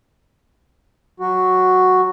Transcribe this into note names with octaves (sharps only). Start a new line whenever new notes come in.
F#3 F#4